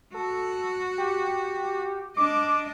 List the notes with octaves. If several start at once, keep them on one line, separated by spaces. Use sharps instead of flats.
F#4 A4
G4
D4 D#5 D6